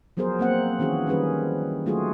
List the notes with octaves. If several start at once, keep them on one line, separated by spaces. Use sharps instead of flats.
F3 F#3 B3 G#4 A#4 C5
A#3 C4 F#5
D#3 E3 C#4 F#4 G#4
D#3 G3 C#4 G#4 B4
F#3 A3 F4 F#4 G#4